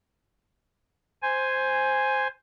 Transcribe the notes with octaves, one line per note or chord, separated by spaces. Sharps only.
C5 G#5